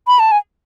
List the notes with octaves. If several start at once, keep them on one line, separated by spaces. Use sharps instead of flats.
B5
A5
G#5